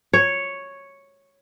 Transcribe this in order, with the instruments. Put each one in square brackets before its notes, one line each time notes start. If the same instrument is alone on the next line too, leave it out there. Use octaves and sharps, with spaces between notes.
[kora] C#5